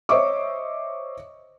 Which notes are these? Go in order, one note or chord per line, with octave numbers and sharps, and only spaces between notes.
C5 C#5 D#5 E5 C#6 D6